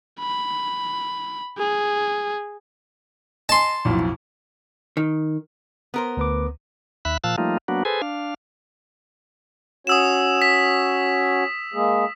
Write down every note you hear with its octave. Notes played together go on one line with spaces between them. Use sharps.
B5
G#4
D#5 G#5 A5 C6
B1 F2 A2
D#3
B3 A#4 C5
D2 B4 D6
D#2 E5 B5 F#6
A#2 F3 F5 A5 E6 F#6
F3 G3 A3 A#3 D#4 F4
F#3 A#3 B3 D4 F#4
G#4 A4 B4 C5 G#5
D4 F5
C#4 F#4 C#5 D#6 E6 E7
B6
G#3 A#3 G#4